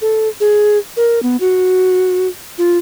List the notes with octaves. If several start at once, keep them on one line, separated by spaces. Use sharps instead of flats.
A4
G#4
A#4
B3
F#4
F4